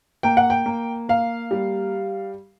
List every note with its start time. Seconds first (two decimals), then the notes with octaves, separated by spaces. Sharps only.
0.23 A#3 G5
0.37 F#5
0.50 G5
0.66 A#3
1.09 A#3 F5
1.51 G3